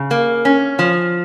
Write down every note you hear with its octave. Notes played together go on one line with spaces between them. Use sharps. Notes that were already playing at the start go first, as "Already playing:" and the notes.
Already playing: C#3
A#3
C#4
F3